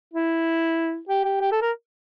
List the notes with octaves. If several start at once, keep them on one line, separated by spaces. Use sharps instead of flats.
E4
G4
G4
G4
A4
A#4